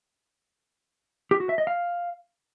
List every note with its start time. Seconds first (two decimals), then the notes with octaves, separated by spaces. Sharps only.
1.31 G4
1.40 F#4
1.49 E5
1.58 D#5
1.67 F5